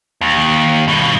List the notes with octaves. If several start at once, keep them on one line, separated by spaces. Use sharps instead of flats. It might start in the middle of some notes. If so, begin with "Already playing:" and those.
D#2
G2 B2